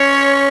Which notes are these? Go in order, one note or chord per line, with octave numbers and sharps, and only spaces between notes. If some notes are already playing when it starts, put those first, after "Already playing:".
Already playing: C#4 C#5